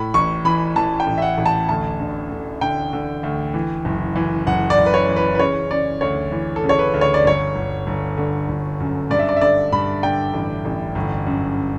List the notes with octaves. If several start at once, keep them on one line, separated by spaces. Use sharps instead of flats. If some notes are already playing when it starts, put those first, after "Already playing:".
Already playing: A2 B5
A1 C#6
E3 B5
E3 A5
G5
A1
E5
F#5
A1
A5
D2 A5
D3
D3
D3 G5
D3
D2
E3
F#1
E3
F#1 F#5
D5
F#1
B4
C#5
E3
B4
B4
C#3 C#5
C#3 D5
D2 C#5
E3
A4
C#3
C#5
B4
D2
C#5
D5
G1 C#5
G1
G1
D3
G1
F#2
G2 D5
E5
D5
E5
D3 D5
G2 B5
D3 G5
A1
A1
G1
F#2